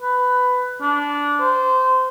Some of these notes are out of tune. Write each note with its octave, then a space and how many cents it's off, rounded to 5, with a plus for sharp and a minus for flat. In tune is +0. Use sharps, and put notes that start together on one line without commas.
B4 +15
D4 -15
C5 -20